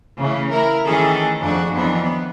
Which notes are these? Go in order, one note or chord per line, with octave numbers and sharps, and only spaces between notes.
C#3 E3 A3 C#4
E4 A#4
D#3 E3 A3 C#4 G#4 A4
F2 D4 F#4 G#4
F2 D#3 E3 F#3 B3 D4
B3